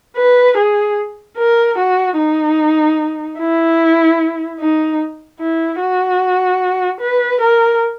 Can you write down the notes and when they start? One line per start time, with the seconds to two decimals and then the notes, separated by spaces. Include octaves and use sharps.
0.17 B4
0.57 G#4
1.38 A#4
1.78 F#4
2.17 D#4
3.39 E4
4.60 D#4
5.40 E4
5.81 F#4
7.01 B4
7.41 A#4